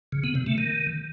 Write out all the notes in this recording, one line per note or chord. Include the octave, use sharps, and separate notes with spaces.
C#3
B3
C3
A3
D#3